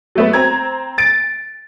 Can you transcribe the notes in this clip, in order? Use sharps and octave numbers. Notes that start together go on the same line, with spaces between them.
F#3 A3 B3
C4 A#5 G#6
A6 D7